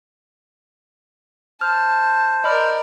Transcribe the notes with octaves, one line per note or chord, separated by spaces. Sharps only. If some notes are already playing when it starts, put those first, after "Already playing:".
C5 A5 F6
A#4 D5 D#5 B5 F6